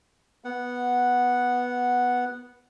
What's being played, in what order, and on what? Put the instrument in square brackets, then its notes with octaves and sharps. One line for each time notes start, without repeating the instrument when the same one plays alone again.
[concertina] B3 F#5